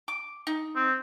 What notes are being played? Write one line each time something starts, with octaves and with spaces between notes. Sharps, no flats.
D6
D#4
C4